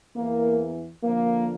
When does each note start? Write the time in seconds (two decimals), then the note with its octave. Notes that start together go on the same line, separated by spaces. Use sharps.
0.16 E2 E3 A#3
1.04 F2 D3 F3 A#3